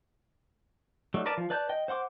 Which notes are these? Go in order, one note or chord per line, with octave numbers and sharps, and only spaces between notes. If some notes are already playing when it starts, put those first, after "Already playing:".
F#3 G3 A3 D#4
A#4 B4 D5 A5
F3
B4 D5 A5 G6
D#5 G5
C5 F#5 C6 D6